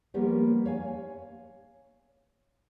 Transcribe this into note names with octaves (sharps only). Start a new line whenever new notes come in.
F3 G3 A#3 B3 C#4 G4
C#5 F5 G#5